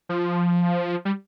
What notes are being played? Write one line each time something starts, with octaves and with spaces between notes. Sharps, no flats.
F3
G3